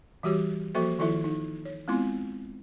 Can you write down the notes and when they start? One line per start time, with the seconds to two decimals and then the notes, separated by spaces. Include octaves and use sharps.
0.23 E3 G3 F#4 G4 C#5
0.75 F3 A#3 F#4 A4 C5 E5
0.99 D#3 F3 E4 F4 A4 E5
1.24 D#4
1.65 C#5
1.88 G#3 B3 C4 E4 F4 C6